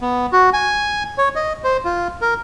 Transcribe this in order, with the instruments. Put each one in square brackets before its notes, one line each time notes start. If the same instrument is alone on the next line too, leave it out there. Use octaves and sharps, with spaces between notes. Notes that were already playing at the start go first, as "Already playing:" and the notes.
[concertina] B3
F#4
G#5
C#5
D#5
C5
F4
A#4